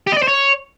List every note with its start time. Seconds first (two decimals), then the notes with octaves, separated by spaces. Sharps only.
0.07 G4
0.12 D#5
0.17 D5
0.22 C5
0.28 C#5